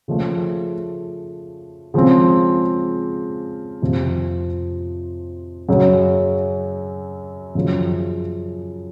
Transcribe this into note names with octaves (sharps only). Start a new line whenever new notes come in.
C#3 F3 A3
C#3 F3 G#3 C4
F2 C3 F3
F#2 C#3 F#3
F#2 C#3 F3